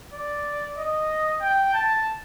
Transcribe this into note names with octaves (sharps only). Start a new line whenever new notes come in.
D5
D#5
G5
A5